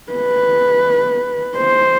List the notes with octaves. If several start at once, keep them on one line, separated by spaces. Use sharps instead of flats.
B4
C5